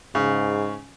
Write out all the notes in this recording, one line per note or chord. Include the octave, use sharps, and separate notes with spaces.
G#2 C#3